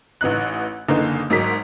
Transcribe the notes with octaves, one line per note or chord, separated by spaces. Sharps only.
A1 E3 D#4 F#6
F#1 D3 E3 A#3 D#4
G#1 G#2 F#3 D#4 A#4 B6